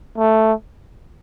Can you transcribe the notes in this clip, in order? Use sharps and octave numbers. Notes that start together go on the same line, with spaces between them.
A3